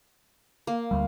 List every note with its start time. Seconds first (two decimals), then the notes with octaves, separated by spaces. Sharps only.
0.67 A#3
0.91 D2 G3